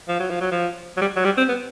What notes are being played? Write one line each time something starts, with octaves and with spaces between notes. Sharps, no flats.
F3
F#3
F3
F#3
F3
F#3
G3
F#3
G3
C4
B3